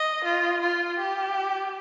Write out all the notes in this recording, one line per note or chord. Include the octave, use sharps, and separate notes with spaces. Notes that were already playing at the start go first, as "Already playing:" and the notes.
Already playing: D#5
F4
F4
G4